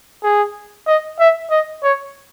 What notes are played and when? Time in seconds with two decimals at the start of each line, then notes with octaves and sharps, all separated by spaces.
0.24 G#4
0.87 D#5
1.20 E5
1.51 D#5
1.83 C#5